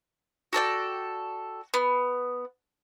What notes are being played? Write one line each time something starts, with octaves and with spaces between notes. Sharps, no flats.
F#4 A4 D5 G5
B3